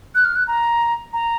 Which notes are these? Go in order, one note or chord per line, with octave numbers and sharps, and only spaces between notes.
F#6
F6
F#6
A#5
A#5